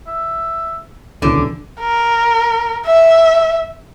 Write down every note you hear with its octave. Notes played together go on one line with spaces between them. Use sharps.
E5
D#1 C#2 B2 D3 E3 C#4 D6
A#4
E5